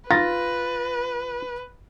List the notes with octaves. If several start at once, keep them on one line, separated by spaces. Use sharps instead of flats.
F4 B4 A6 A#6